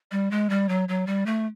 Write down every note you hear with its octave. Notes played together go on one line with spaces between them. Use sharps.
G3
G#3
G3
F#3
F#3
G3
A3